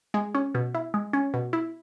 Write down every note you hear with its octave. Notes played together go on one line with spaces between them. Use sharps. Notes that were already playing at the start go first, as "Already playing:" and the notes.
G#3
C#4
B2
E4
G#3
C#4
B2
E4